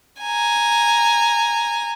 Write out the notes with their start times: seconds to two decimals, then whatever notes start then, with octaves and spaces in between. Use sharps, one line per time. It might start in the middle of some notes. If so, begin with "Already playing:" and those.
0.22 G#5 A#5